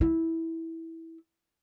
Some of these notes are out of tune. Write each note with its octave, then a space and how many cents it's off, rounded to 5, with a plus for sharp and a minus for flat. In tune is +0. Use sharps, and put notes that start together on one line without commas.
E4 -10